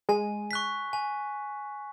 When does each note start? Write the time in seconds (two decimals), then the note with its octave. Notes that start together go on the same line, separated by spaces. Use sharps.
0.09 G#3 G#5
0.51 C#6 F#6 B6
0.93 G#5